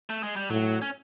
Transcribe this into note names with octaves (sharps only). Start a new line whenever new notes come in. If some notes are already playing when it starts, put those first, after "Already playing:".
A3
G#3
G3
A2 F#3
C#4